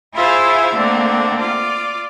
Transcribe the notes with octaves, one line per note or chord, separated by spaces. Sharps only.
E4 F4 G#4 C5 E5 F5
D3 A3 A#3 C4 D4
F4 D5